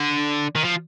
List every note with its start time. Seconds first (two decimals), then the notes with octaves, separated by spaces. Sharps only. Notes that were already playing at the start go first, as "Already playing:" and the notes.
Already playing: D3
0.55 D#3
0.64 F3